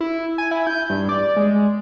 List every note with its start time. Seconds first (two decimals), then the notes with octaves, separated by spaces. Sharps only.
0.01 E4
0.38 G#5
0.51 E4
0.67 G6
0.90 G2
1.09 D5
1.37 G#3